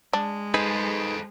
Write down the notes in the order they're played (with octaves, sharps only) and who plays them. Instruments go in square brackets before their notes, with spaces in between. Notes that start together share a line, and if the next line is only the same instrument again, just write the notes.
[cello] G#3 [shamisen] D4
[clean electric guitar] D#4 G#4 B4 [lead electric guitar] A4 C5